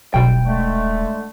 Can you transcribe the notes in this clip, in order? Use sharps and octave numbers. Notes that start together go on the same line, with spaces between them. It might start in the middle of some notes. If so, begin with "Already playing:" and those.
D#1 B1 B2 G3 G5
D3 G#3 A3